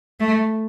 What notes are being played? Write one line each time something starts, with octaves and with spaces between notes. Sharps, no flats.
A3